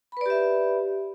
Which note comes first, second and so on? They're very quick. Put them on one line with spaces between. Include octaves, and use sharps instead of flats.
B5 B4 D5 G4 E5